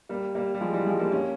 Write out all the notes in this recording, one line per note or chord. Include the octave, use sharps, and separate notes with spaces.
G3 A#3
G3 A#3
G3
F3 G#3
E3 G3
F3 G#3
G3 A#3
A#3 C#4